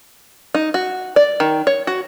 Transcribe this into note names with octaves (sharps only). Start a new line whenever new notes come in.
D#4
F#4
D5
D#3
C#5
F#4